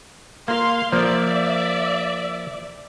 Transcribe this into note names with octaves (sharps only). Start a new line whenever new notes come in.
A#3 F5 C6
F3 A#3 D5 E5